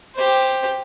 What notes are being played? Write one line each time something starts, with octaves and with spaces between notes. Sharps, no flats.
G4 C5